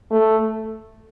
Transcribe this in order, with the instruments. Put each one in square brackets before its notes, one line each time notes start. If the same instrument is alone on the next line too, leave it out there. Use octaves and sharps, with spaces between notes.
[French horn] A3